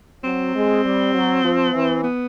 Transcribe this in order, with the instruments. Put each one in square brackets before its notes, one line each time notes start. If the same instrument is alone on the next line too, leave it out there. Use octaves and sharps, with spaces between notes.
[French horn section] F#3 [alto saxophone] C4
[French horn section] G#3
G3
F#3
F3
E3
[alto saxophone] B3